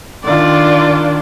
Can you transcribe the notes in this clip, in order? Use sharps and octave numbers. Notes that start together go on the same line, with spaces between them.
D#3 D4 F4 D5